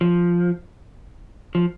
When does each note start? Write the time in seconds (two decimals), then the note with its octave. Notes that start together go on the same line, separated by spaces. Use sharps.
0.01 F3
1.55 F3